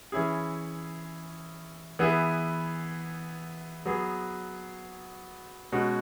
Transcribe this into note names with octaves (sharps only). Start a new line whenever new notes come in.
E3 C#4 E4 G#4
E3 B3 E4 G#4
F#3 B3 G#4
B2 G#3 C#4 F#4